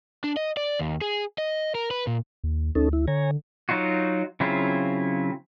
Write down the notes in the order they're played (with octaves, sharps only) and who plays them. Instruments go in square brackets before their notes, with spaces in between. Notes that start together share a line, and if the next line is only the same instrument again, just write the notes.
[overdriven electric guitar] D4
D#5
D5
D#2
G#4
D#5
A#4
B4
A#2
[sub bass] D#2
[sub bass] D2 [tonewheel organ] C#4 D#4 A4
[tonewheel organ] E4
[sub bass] D3 [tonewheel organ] C#5 G#5 A#5
[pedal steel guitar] F#3 D#4 F4 F#4
C#3 F#3 C4 E4 F4